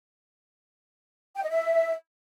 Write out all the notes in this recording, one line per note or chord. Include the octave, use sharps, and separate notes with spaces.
G5
D#5
E5